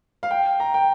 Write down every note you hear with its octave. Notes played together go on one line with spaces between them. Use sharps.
F5
G5
A#5
G5